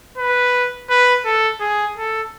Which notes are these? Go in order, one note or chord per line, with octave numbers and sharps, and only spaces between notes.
B4
B4
A4
G#4
A4